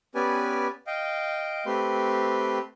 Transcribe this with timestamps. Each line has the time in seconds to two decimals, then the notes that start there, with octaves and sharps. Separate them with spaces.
0.15 B3 C#4 G4 B4 D5 G#5
0.87 D#5 F5 G5
1.66 A3 C4 G4 B4 C6